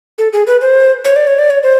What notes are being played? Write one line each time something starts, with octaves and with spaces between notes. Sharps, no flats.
A4
G#4
B4
C5
C#5
D5
C#5
D5
C#5
C5